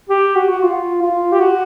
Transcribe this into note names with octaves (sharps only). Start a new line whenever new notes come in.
G4
F#4
F#4
F4
F4
G4
F#4